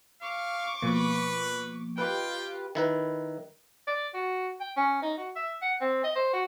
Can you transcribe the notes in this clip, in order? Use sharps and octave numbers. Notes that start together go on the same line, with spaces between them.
F5 C#6 D6
B2 F3 A#3 B4
F4 G4 B4 G5
D#3 E4 B4
D5
F#4
G5
C#4
D#4
F#4
E5
F#5
C4
D#5
C5
F#4